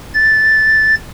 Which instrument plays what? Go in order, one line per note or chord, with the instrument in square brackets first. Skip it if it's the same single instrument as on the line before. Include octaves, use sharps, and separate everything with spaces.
[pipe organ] A6